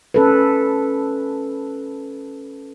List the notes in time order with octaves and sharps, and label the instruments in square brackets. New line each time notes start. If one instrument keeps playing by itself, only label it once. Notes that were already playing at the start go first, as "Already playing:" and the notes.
[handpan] C#4 A4 B4